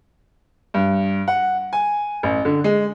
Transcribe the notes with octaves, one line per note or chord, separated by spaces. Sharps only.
G2
F#5
G#5
A1
D3
G#3